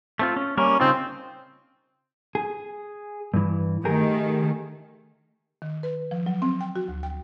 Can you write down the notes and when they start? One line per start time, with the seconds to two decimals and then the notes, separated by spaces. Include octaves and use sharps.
0.19 A3 C4 F4
0.36 C#4
0.57 G3 A#3 C#4 A#4
0.80 C#3 C4 D#4 F4
2.35 G#4
3.34 G2 E3
3.85 D#3 A3 G4 G#4 A#4
5.62 D#3
5.83 B4
6.11 F3
6.26 F#3
6.42 C4
6.61 G5
6.76 F#4
6.88 D2
7.03 G5